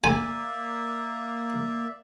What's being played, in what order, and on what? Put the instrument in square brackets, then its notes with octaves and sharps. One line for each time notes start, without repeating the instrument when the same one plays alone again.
[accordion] A#3 [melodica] D5 E5 [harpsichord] G#5